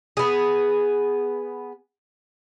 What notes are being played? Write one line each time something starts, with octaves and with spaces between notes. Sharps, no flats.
B3 G#4